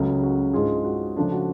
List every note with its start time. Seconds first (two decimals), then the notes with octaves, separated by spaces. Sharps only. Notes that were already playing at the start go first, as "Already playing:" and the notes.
Already playing: C#2 C#3 F#3 A3
0.23 F#4
0.53 G#2 G#3 D4 F4 G#4
0.84 F#4
1.16 C#3 F3 A3 D4 F4
1.32 F#4